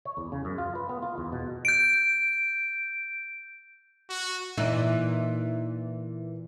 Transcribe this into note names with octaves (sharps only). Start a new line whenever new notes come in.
C#5
E2
C#3
F#2
F4
B4
B3
F4
E2
B2
G6 D7
F#4
A#2 E3 D#4